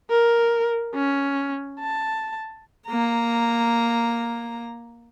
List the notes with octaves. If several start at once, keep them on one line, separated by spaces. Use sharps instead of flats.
A#4
C#4
A5
A#3 A#5